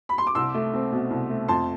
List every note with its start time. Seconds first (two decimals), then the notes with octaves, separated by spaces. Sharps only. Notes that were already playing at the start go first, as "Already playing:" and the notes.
0.09 B5
0.18 C6
0.27 D6
0.35 C2 C6 E6
0.54 A3
0.73 C4
0.92 B2
1.11 C2
1.30 A3
1.48 F2 A5 C6